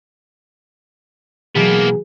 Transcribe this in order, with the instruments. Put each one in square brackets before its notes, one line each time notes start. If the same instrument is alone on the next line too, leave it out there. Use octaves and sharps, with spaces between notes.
[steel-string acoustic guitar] B2 E3 F#3 [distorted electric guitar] A#3 B3 [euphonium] G#4